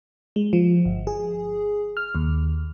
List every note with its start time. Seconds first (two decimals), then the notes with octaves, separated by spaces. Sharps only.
0.36 G#3
0.53 F3
0.85 G1
1.07 G#4
1.97 F6
2.15 D#2